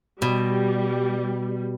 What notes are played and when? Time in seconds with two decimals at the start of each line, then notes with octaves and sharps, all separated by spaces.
0.22 B2 G3